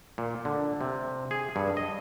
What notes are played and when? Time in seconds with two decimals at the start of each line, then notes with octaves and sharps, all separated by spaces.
0.18 A#2
0.45 D3
0.81 C3
1.31 G#4
1.56 G2
1.77 D#5